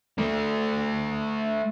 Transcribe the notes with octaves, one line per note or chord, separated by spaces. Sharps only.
A3 D5